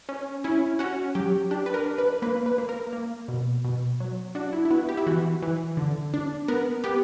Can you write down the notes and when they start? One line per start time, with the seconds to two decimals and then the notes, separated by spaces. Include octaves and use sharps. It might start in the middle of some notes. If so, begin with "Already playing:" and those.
0.09 C#4
0.44 C#4 E4
0.79 C#4 F#4
1.15 F#3 G4
1.51 D4 G4
1.66 B4
1.74 A#4
1.86 D4
1.98 B4
2.22 A#3 B4
2.46 B4
2.58 A#3
2.69 A#4
2.93 A#3
3.28 B2
3.64 B2
4.00 F#3
4.35 D4 F#4
4.53 E4
4.65 E4
4.70 B3 F#4
4.89 G4
4.97 E4
5.07 E3 F#4
5.43 E3
5.77 D3
6.14 D4
6.48 B3 A#4
6.84 B3 G4